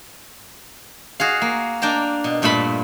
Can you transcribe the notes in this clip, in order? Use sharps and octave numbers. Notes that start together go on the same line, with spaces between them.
F#4 G#4 F5
A#3
A#3 D4 G5 A5 A#5
B2
G2 A#2 A3 A5 B5